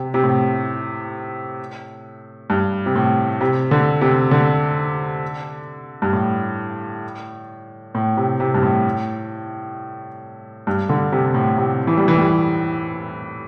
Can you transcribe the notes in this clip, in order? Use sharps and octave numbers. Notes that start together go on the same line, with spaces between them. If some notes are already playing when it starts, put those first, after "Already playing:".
Already playing: C3
C3
A2
G2
C3
A2
C3
D3
C3
D3
G2
A2
A2
C3
C3
G2
A2
G2
D3
C3
A2
C3
E3
G3
E3
G3